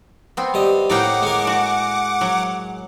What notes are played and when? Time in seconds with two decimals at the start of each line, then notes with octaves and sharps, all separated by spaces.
0.37 B3 C4
0.54 G2 D#5
0.90 A2 A#3 D#4 F#5 G5 D6
1.22 G#3 A#4
1.47 F#4
2.21 F#3